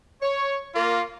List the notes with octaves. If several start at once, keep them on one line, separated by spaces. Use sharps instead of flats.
C#5
A#3 F4